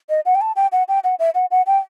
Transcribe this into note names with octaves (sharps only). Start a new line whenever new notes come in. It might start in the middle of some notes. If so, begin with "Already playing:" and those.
D#5
F#5
G5
A5
G5
F#5
G5
F#5
E5
F#5
F#5
G5